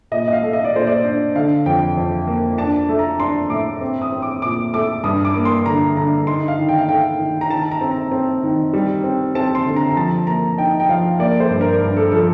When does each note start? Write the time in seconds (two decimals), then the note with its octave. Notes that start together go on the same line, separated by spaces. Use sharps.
0.12 A#2 D#5
0.28 D#5
0.33 F5
0.42 A3
0.53 D#5
0.65 D5
0.74 A#2 C5
0.87 D5
1.04 D4
1.35 D3 F5
1.66 F2 G5
1.97 F2
2.28 A#3
2.58 D4 A5
2.89 A3
2.99 A#5
3.20 D4 C6
3.50 A2 D6
3.81 C4
4.02 D#6
4.12 C4
4.22 D6
4.42 A#2 D6
4.74 A3 D6
5.04 G2 D#6
5.25 D6
5.36 A#3
5.45 C6
5.66 D3 A#5
5.96 D3 A#5
6.27 D#4 C6
6.48 F5
6.58 D#3
6.69 G5
6.78 F5
6.89 A3 G5
7.19 D#3
7.41 A#5
7.50 D#3 A5
7.72 A#5
7.81 C4
7.91 A#5
8.12 C4
8.43 D#3
8.73 G3
9.04 C4
9.35 C4 A5
9.55 C6
9.66 D3
9.76 A#5
9.91 A#5
9.96 F3 A5
10.27 A#3 A#5
10.57 D#4 G5
10.80 G5
10.89 F3 F5
11.19 A#3 D5
11.40 C5
11.50 G2
11.61 A#4
11.81 G2
11.97 A4
12.12 F3 A4